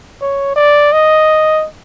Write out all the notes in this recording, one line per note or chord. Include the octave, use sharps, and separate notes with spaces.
C#5
D5
D#5